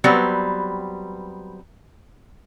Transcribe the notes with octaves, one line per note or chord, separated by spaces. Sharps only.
F#3 G3 B3 C4 B4